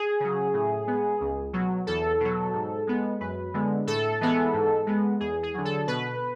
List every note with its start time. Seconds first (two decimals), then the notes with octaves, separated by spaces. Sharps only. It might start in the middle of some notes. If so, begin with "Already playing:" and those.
Already playing: G#4
0.20 C#3 F#3
0.54 A2
0.87 G#3 B3
1.21 C#2
1.53 B2 F#3
1.87 E2 A4
2.20 B2 F#3
2.53 G#2
2.87 G#3 B3
3.20 F#2 B4
3.54 D3 G#3 B3
3.87 A2 A4
4.21 E3 G#3 B3
4.53 G#2
4.87 G#3 B3
5.20 E2 G#4
5.43 G#4
5.54 D3 F#3
5.65 A4
5.87 B2 B4